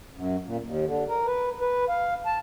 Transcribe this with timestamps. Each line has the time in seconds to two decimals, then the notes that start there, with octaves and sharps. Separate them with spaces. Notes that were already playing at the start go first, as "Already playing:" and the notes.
0.15 F#2
0.45 A#2
0.65 D#2
0.86 D3
1.09 A#4
1.27 B4
1.61 B4
1.89 F5
2.26 A5